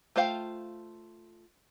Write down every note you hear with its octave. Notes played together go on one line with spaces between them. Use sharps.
A3 F4 C5 F5 G5